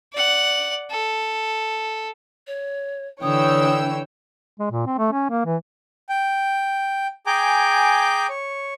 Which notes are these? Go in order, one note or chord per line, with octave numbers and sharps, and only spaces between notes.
D5 F#5
A4
C#5
D3 E3 C#5 G5 D#6 E6
G#3
A#2
C4
A3
C#4
A#3
E3
G5
G#4 G5 G#5 A#5 D6 G6
C#5